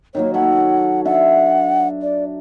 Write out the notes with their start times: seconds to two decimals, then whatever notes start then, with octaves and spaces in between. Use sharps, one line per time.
0.15 D#3 F#3 A#3 C#5
0.34 A4 C#5 F#5 B5
1.05 D4 E5 F#5
2.02 D5